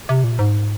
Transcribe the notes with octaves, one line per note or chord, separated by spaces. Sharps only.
C3
A#2
G#2